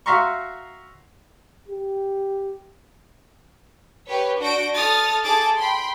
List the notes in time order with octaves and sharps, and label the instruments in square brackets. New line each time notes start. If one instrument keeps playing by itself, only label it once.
[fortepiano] F#4 E5 F5 A#5 C6 C#6
[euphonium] G4
[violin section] G4 B4 C#5
D4 F#4 G6 A#6 D7
A4 D#6 F6 A6
G#4 A4 A5 D6 A6
G5 B5 C6